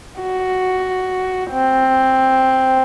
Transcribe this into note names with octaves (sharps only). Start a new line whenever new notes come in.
F#4
C4